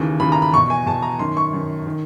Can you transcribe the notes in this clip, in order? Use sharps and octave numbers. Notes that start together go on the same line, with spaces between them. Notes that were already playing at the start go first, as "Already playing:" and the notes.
Already playing: D#2 C#3 E3
D#2 C#3 E3 B5
A#5
B5
E2 B2 C#6
G#5
E2 B2 A5
A#5
F#2 D#3 C6
C#6
F#2 D#3
D#3